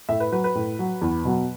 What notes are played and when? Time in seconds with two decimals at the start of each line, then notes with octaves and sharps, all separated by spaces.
0.09 A2 E5
0.20 B4
0.32 F#3 B4
0.44 B4
0.55 A2
0.79 F#3
1.01 E2
1.25 B2 F#3